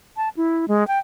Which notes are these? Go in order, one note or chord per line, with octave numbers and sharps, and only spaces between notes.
A5
E4
G#3
G5